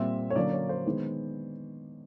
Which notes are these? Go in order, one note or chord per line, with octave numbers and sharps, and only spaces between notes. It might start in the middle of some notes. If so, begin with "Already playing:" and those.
Already playing: A#2 G3 C4 E5
C#5
D3 F#3 A#3 C#4 D5
C#5
C5
D#3 G#3 B3